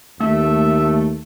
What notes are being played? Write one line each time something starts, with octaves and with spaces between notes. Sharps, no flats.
D#2 A3 E5